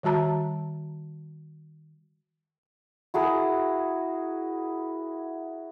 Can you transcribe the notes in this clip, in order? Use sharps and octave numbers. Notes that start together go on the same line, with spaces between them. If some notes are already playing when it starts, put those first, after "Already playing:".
D#3 G3 F#4 A5 A#5
E4 F#4 G#4 A#4